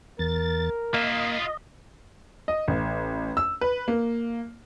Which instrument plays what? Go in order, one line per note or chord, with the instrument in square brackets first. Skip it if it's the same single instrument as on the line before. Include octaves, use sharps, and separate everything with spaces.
[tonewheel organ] E2 A6 [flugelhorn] A#4
[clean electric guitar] A#3 [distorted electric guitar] F4 E5 [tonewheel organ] D#5
[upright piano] D#5
A1
E6
B4
A#3